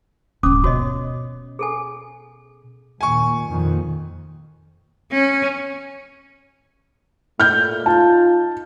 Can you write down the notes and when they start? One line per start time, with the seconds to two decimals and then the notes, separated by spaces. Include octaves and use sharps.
0.43 D#1 G#2 C#4 D6 D#6
0.64 B2 F#4 C#5 D#5
1.59 G#4 A4 G#5
3.01 D#2 A#2 G#5 C#6
3.47 F2 A#2 D#3
5.12 C#4
7.40 A#2 A3 F6 G6
7.86 D#4 F4 A5